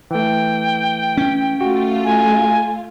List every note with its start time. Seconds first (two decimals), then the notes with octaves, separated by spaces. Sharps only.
0.11 E3 A3 G5
1.17 C#4
1.61 A3 F4 F#4
2.05 G#5